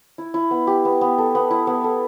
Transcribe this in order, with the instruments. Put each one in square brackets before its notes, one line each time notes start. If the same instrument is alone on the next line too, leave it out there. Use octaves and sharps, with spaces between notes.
[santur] E4
E4
B3
G4
B3
B3
A4
B3
E4
B3
A4